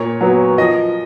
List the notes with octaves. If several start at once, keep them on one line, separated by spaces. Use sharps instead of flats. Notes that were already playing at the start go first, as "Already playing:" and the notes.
Already playing: A#2 C#5
F#3 B3
F3 D#5